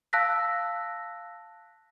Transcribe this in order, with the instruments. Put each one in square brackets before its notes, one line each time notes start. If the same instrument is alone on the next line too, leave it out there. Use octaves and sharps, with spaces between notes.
[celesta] F5 A5 E6 F#6 A#6 B6